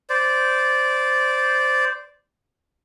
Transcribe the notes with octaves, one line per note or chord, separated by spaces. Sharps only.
C5 D5